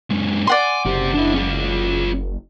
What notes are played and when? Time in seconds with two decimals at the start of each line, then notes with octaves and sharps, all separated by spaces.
0.10 F#2 G#3
0.47 D5 F#5 G#5 C6
0.85 F#1 C4 G4
1.14 D4 E4
1.34 C#4 F4